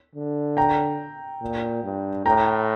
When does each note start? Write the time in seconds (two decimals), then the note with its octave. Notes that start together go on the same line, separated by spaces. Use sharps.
0.16 D3
0.57 G5 A#5
1.42 A#2
1.84 G2
2.25 A2 G5 A#5